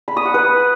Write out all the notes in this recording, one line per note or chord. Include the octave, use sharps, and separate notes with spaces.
B5
D#6
F#5
B4